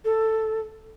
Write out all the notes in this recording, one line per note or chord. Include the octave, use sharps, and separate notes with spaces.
A4